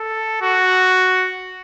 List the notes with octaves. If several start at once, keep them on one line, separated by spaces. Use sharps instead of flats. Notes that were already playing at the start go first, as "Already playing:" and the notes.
Already playing: A4
F#4